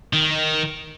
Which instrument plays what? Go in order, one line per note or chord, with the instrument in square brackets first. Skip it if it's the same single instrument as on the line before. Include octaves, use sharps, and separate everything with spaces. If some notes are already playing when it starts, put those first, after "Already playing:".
[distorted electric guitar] D#3